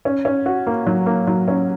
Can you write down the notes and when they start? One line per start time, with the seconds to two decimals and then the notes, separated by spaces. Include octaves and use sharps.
0.05 C#4
0.25 C#4
0.46 F#4
0.67 A#3
0.87 F#3
1.06 A#3
1.27 F#3
1.48 C#4